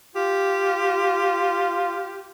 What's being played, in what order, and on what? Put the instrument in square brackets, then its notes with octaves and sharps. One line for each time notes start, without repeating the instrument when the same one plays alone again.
[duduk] F4 [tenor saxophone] G4